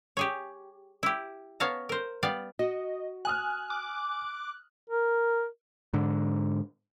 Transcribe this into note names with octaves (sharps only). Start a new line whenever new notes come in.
G4 G#4 C#5
E4 G4
B3 C#5 F5 A5 A#5
A#4 C5
G3 B3 D5 F5
F#4 D#5
G#5 D#6 F6 F#6
D6
A#4
G#2 D3